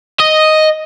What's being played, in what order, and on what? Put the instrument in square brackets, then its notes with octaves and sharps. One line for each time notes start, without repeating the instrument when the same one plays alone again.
[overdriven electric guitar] D#5